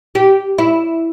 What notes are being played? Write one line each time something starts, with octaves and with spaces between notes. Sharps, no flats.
G4
E4